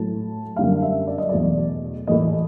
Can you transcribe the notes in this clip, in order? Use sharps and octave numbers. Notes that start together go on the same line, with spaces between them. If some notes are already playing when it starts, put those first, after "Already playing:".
Already playing: A2 F#3 A3 A5
F#2 D3 G3 F5
E5
D5
D#5
E2 B2 F#3 A3 D5
A2 E3 A3 D#5